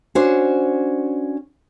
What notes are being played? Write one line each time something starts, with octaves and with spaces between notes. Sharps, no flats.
C#4 D4 F#4 C5